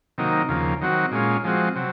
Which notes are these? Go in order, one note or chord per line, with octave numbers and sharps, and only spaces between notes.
C3 D#3 F#3 A#3 D#4
D#2 C#3 F3 A#3
D#3 F#3 C4 F#4
A#2 G#3 C#4 F4
F3 G#3 C4 F#4
C3 F#3